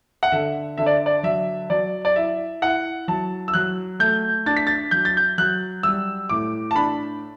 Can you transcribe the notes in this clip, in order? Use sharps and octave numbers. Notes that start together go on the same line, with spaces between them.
F#5
D3 E5
D3 E5
D5
D5
F#3 E5
F#3 D5
D5
E4 E5
E4 F#5
F#3 A5
E6
F#3 F#6
A3 G6
D4 A6
B6
A6
F#3 G6
A6
G6
F#3 F#6
G3 E6
A2 D6
A5
D4 B5